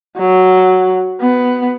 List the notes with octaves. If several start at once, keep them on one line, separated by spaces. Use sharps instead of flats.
F#3
B3